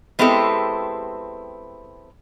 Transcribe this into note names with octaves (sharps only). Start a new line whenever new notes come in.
G#3 B3 C4 E4 G4 A4